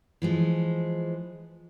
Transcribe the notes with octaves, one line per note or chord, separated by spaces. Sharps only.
E3 F3 G#3